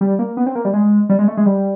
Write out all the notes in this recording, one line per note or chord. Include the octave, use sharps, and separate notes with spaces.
G3
A#3
B3
C4
A#3
G3
G#3
G3
G#3
A3
G#3
G3